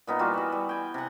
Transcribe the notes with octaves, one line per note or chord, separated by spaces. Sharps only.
A#2 B3 D#4
E3 G3 F4 F#4
E3 F#4
G3
G5 G#5
C3 F#5